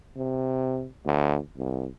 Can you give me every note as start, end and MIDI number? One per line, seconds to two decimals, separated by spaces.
0.16 0.87 48
1.06 1.39 38
1.57 1.87 36